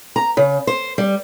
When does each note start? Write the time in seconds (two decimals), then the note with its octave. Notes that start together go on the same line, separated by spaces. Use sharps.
0.16 A#5
0.37 C#3
0.67 C5
0.98 G3